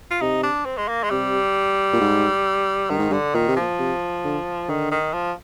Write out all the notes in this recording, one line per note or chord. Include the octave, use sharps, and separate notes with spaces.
F4
C3 D#4
D4
C4
G#3
A#3
G#3
C3 G3
A#2
G#2
G2 D#3
G#2
G2
D3
A#2 D#3
C3
A#2 F3
C3
D3
D3 D#3
D#3
F3